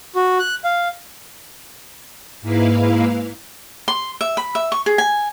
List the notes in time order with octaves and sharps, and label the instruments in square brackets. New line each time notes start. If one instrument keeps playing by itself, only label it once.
[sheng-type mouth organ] F#4
F#6
F5
[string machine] G#2 A#3 E4 B4 F5
[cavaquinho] C6
E5
B5
E5
C#6
G#4
G#5